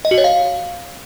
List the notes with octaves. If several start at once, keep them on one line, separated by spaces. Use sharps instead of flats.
D#5
F#4
C#5
F5